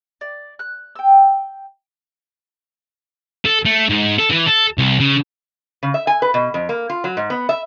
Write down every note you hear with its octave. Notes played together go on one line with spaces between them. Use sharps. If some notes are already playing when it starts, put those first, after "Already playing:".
D5
F#6
G5 E6
A4
A3
G#2
A4
E3
A4
C2
C#3
C#3
E5
G#5
B4
B2
F2
A#3
F4
F#3
G#2
B3
E5